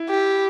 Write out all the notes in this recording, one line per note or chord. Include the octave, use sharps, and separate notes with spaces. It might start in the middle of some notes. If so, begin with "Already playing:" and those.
Already playing: E4
G4